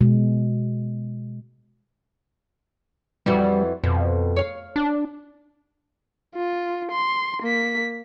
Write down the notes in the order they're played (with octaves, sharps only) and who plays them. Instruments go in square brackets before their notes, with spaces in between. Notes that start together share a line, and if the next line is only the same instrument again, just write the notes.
[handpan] B2 G#3
[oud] F2 E3 F#4 [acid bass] G3
[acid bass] F2 [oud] B2
[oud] C#5 F5
[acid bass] D4
[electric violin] F4
C6
A#3 B6